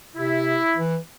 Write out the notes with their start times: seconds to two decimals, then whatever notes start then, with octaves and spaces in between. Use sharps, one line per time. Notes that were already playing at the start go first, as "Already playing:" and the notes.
0.15 C3 E4
0.76 E3